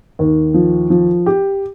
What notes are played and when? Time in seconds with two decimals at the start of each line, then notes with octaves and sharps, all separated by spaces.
0.19 D#2
0.54 F3
0.90 F3
1.26 G4